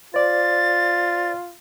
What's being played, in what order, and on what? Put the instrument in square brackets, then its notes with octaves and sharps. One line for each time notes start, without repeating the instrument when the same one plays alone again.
[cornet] F4 [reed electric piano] C5 D5 [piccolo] A6